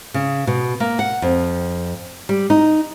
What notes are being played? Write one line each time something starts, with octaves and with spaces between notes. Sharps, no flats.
C#3
B2
A#3
F#5
F2
G3
D#4